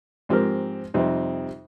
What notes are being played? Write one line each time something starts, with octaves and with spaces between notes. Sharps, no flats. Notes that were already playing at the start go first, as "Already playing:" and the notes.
G#2 F3 C4 G4 A#4
F2 C3 G3 C4 D#4